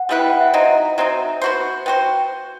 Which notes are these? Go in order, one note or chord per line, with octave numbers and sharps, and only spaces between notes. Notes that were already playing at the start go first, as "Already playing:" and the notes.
Already playing: F#5
G3 B3 E4 B4
G5
F#5
E5
F#3 C4 D#4 D#5
F#3 C4 D#4 E5
B3 F#4 C5
B3 F#4 C5 G5